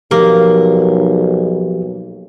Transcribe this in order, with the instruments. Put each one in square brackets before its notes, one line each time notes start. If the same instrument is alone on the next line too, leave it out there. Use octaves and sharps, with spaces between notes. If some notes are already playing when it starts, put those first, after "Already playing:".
[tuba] B1 [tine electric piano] F3 G4 [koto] A#3